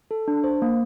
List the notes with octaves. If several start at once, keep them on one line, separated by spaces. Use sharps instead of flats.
A4
D4
C5
A#3